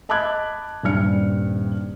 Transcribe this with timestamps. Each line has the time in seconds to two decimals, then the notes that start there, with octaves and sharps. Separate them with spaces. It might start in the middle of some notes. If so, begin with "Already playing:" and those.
0.09 D#5 A5 B5 D6 F#6 G#6
0.83 D#1 G2 G3 F6 C#7